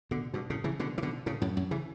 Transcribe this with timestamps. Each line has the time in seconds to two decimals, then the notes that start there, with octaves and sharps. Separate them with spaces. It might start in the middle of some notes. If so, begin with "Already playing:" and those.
0.11 B2 D3
0.34 G2 B2
0.50 A2 C#3
0.64 C#3 E3
0.79 B2 D3
0.98 E3
1.03 B2 D3
1.26 A2 C#3
1.42 F#2 A2
1.57 F#2
1.71 C#3 E3